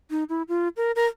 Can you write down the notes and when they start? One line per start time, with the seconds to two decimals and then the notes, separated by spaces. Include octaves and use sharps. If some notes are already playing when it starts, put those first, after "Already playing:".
0.10 D#4
0.29 E4
0.48 F4
0.77 A#4
0.96 A#4